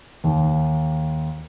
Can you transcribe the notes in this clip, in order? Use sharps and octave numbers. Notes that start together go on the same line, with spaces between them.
D#2